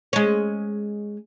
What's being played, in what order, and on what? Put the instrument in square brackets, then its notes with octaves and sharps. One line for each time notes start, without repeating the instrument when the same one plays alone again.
[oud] G#3 C#4